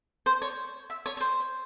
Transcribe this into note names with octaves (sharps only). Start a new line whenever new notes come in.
C5
C#5
E5
C#5
C#5
C5